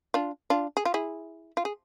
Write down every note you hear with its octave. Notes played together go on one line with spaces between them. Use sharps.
D4 F4
D4 F4
G#4
F4
E4 G#4
F4
G#4